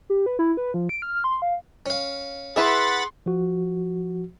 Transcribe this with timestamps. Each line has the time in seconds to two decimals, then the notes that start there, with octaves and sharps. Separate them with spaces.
0.10 G4
0.26 B4
0.39 E4
0.57 B4
0.74 F3
0.89 D7
1.02 F6
1.24 C6
1.42 F5
1.86 C#4 F5
2.56 E3 E4 G#4 B4 F#5 B5 C6 A6
3.26 F3 F#4